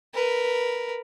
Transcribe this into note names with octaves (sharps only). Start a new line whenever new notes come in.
A#4 B4